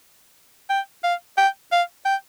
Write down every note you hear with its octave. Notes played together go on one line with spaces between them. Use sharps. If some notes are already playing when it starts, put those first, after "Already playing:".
G5
F5
G5
F5
G5